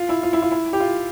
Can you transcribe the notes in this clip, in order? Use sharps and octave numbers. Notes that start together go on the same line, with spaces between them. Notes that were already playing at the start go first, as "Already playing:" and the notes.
Already playing: F4
E4
F4
E4
F4
E4
G4
F4